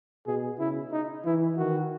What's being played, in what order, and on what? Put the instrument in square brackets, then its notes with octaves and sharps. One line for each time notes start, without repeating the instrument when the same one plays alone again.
[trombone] B2 [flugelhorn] G#4
[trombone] C#3 [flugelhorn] E4
[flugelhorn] D#4
[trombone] E3 [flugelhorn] E4
[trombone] D#3 [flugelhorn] F#4